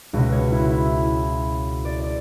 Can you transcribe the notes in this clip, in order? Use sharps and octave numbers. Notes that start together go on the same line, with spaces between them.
C#2 B2 F#4
C#5
E4
E4
D5
D5